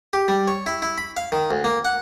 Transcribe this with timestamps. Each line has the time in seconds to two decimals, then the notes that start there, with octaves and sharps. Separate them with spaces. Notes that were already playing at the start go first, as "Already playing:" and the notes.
0.13 G4
0.28 G3
0.48 C#5
0.66 E4
0.82 E4
0.98 B5
1.17 F5
1.32 D#3
1.51 D2
1.64 A#3
1.85 F#5